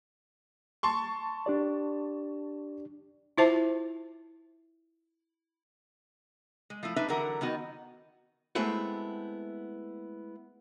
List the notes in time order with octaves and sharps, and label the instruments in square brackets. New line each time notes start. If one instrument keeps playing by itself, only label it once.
[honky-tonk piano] A5 C6 C#6
[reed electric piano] D4 G4 D5
[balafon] E4 F4 C5 E5 A5
[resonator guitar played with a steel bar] G#3
F3 A3 E4
D4 D#4 B4 E5
D3 E3 F#3 A#4 F#5
D#3 B3 D#4 F#4
[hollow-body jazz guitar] G#3 A3 B3 C4 E4 F#4